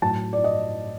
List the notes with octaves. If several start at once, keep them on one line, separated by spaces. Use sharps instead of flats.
A2 F#3 A5
D5
D#5